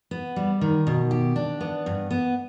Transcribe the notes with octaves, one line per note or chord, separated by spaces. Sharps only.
B3
G3
D#3
B2
G4
D4
B3
G2
B3